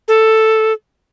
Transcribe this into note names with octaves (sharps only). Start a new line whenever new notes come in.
A4